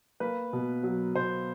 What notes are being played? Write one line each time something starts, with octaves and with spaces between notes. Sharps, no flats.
A#3 B4
B2
F#3
B2 C5